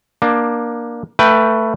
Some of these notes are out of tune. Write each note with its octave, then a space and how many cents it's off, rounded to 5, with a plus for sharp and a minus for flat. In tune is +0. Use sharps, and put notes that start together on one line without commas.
A#3 +15 D4 +20
A3 +15 B4 +0 G5 -5